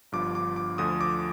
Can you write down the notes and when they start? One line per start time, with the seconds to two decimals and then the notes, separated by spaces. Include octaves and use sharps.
0.12 G1 G2 F3 D6
0.35 D6
0.56 D6
0.78 D2 D3 F3 D#6
1.01 D6